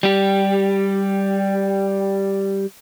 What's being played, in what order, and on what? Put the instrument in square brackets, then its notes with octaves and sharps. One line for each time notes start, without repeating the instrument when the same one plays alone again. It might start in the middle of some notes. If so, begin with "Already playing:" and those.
[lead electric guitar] G3 G4